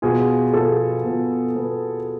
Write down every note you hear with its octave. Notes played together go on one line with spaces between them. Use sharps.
B2 B3 F4 G#4
B2 B3 F4 A4
B2 B3 F4
B2 B3 F4